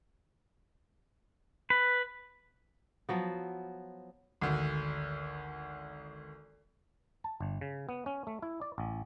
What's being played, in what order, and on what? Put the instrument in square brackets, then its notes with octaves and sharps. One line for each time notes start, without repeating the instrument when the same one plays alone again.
[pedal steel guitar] B4
[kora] F3 F#3 B3
[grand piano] G#1 D2
[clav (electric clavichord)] A5
G1
C#3
B3
C#4
A3
E4
D5
A1